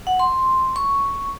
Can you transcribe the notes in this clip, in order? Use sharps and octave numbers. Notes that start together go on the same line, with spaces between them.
F#5
C6
C#6